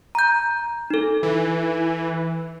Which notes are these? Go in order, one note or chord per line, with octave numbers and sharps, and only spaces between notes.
A#5 G6
D#4 A4
E3